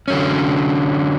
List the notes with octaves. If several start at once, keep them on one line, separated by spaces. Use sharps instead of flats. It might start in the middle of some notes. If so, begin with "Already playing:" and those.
D3 F#3 C#4